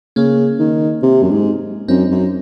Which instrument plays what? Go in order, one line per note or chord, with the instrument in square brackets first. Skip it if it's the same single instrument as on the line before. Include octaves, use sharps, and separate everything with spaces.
[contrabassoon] C#3 [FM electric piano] A#3 C#4
[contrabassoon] D#3
C3
F#2
G#2
[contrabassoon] F#2 [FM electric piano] C4 D#4
[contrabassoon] F#2